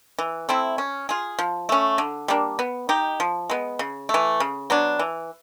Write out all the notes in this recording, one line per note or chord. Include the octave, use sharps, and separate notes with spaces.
E3
A3 C4 E4
C#4
F4 G#4
F3
A3 C#4
D3
G3 A#3 D4
B3
D#4 G4
F3
G#3 B3
C#3
A3
E3
C#3
F#3 B3 D4
E3